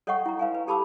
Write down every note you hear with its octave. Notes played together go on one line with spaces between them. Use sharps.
A4 C#5 D#5 F#5 G5 C#6
E4 A#5
B4 F5 G#5
B4
G4 A4 A5 B5 D6 E6